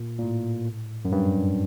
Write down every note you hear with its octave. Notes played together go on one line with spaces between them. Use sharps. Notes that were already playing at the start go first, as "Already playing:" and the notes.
Already playing: A#2
A#2
A2
F#2
G2